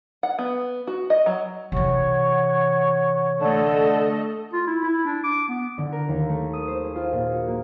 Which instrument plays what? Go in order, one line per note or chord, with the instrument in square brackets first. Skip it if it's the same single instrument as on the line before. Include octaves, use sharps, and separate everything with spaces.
[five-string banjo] F#5
B3
F#4
D#5
F#3
[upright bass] C3 E3 [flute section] C#5 F#5 C#6
[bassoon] D3 [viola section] A3 A4 D#5
[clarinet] F4
E4
E4
D4
D6
B3
[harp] D3
A#4
D#2
A3
D#6
C5
G#4
F4
A#2
F#4
A#3